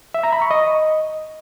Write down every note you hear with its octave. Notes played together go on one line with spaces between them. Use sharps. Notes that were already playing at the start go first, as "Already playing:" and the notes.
E5
A#5
B5
C#6
D#5